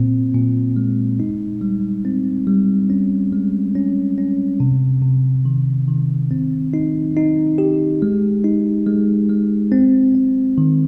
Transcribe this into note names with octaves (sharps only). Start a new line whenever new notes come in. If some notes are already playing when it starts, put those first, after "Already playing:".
Already playing: A#2 C4
A#2
G#3
D#4
G3
C4
G3
C#4
G#3
C#4
C#4
C3
C3
D#3
D#3
C4
D#4
D#4
G4
G#3
D#4
G#3
G#3
C4
C4
D#3